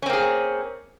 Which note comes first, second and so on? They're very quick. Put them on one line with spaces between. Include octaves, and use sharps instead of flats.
C#4 C4 A#3 G#4